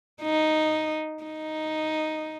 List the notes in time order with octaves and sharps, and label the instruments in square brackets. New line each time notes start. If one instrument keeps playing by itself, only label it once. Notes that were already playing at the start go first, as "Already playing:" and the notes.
[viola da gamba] D#4
D#4